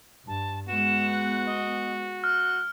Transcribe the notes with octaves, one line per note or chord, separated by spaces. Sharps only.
G2 A5
G#3 B3 F#4 E7
F#6
D#5
F6 F#6